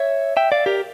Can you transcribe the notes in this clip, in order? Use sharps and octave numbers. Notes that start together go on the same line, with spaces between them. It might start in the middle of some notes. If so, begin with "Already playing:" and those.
Already playing: C#5 E5
E5 G5
D5 F5
G4 A#4